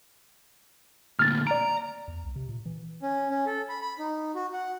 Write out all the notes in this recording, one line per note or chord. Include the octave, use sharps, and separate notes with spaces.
D2 A#2 F6 A6
D5 A#5 D7
E2
C2
C3
A#2
E3
C#4
C#4
A4
B5
B5
D#4
F#4
F#5